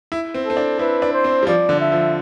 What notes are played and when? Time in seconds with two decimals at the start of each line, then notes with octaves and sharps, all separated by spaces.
0.12 E4
0.34 C4
0.46 C4 A4
0.57 D4
0.79 E4 B4
1.02 D4
1.14 C5
1.24 C4
1.43 G3
1.47 F3 D5
1.69 D3
1.80 E5
1.92 F3